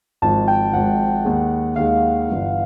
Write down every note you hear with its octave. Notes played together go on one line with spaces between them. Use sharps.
G#1 G#2 F3 A5
G5
G#1 G#2 F3 F#5
D#2 D#3 G#3
D#2 D#3 G#3 F5
G1 G2 E3